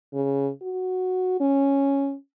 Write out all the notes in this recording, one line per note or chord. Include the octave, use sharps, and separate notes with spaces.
C#3
F#4
C#4